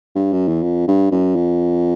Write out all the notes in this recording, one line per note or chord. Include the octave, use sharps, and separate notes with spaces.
G2
F#2
E2
F2
G2
F#2
F2